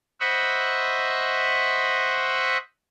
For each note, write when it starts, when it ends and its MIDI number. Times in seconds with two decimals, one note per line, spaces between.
0.20 2.58 72
0.20 2.58 75
0.20 2.58 76
0.20 2.58 78
0.20 2.58 83
0.20 2.58 85